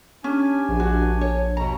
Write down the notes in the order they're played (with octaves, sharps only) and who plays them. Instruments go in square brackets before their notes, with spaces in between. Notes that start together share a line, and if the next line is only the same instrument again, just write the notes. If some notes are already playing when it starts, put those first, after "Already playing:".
[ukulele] C#4 [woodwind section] D4 G4 G#5
[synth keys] A#1
[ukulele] F#4
C#5
[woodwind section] D#2 B2 [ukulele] A#5